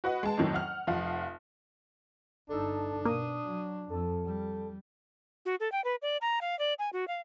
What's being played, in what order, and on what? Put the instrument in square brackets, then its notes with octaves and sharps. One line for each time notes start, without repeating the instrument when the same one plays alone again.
[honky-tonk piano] F#4 B4 D#5 F#5
G#3 A5
F2 A2 D#3 F#3
F#5 F6
F1 F3 F5 F#5
[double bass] G1 D#4 [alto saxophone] D4 [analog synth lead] A4
[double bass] B2 [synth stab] A#3 [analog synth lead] D#6
[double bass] F#3
[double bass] F2 [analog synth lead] A4
[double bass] G3
[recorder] F#4
A4
G5
B4
D5
A#5
F5
D5
G#5
F#4
F5